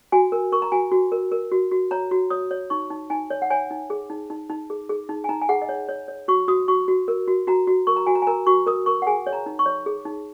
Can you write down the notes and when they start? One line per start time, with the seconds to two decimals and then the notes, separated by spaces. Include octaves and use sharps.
0.12 F#4 G#5
0.32 A#4
0.52 A#4 C#6
0.62 A#5
0.72 F#4 G#5
0.92 F#4
1.12 A#4
1.32 A#4
1.52 F#4
1.71 F#4
1.91 C#5 A#5
2.11 F#4
2.30 C#5 D#6
2.51 C#5
2.70 D#4 C#6
2.90 D#4
3.10 D#4 G#5
3.30 C#5
3.42 F#5
3.50 C#5 G#5
3.71 D#4
3.90 G#4
4.10 D#4
4.30 D#4
4.50 D#4
4.70 G#4
4.89 G#4
5.09 D#4
5.24 G#5
5.29 D#4 A#5
5.42 G#5
5.49 G#4 F#5
5.62 D#5
5.69 C#5
5.89 C#5
6.08 C#5
6.28 F#4 C#6
6.48 F#4 D#6
6.68 F#4 C#6
6.88 F#4
7.08 A#4
7.27 F#4
7.47 F#4 A#5
7.67 F#4
7.87 A#4 C#6
7.96 A#5
8.06 F#4 G#5
8.15 A#5
8.22 G#5
8.27 A#4 A#5
8.47 F#4 C#6
8.67 A#4 D#6
8.86 A#4 C#6
9.02 F#5
9.07 G#4 G#5
9.27 C#5
9.33 A#5
9.46 D#4
9.59 C#6
9.66 C#5
9.86 G#4
10.05 D#4